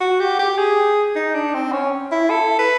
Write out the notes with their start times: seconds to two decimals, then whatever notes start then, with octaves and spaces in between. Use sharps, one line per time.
0.01 F#4
0.20 G4
0.39 G4
0.58 G#4
1.15 D#4
1.34 D4
1.54 C4
1.72 C#4
2.12 E4
2.30 A4
2.59 B4